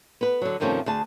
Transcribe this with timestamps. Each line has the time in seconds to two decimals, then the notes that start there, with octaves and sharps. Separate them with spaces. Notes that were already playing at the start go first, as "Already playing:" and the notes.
0.21 B3 B4
0.42 D3 F#3
0.60 G2 C3 D#3 F3 A3 C#4
0.86 D2 G#4 A5